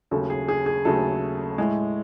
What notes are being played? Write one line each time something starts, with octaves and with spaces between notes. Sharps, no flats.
D#2 C#3 F#3 A3 A4
G#4
G#4
G#4
D#2 C#3 F#3 A3 A4
A2 G#3